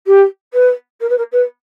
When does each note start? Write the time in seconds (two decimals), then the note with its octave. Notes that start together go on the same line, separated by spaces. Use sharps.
0.07 G4
0.53 B4
1.00 A#4
1.09 B4
1.17 A#4
1.32 B4